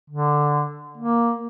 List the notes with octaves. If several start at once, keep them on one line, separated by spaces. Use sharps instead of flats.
D3
A#3